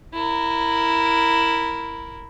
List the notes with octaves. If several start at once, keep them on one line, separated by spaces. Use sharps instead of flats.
E4 A#4